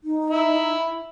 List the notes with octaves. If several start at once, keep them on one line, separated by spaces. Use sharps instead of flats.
D#4
E4